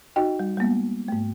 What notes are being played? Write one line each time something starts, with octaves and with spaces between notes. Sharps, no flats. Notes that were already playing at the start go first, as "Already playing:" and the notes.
D#4 F#4 D#5 G5
G3
G3 G#3 A#3 B3
G#2 A3